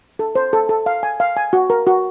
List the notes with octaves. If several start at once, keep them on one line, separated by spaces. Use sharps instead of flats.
A4
C5
A4
A4
F5
G#5
F5
G#5
F#4
A#4
F#4